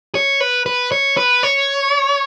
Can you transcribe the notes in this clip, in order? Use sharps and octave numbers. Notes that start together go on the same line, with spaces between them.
C#5
B4
B4
C#5
B4
C#5